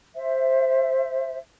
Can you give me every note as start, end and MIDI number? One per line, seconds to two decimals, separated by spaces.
0.15 1.37 72
0.15 1.37 76